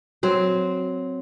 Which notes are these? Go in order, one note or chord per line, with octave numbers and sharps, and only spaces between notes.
F#3 C4